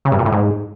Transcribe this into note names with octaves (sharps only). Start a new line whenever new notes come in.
C#3
G2
A#2
A2
G#2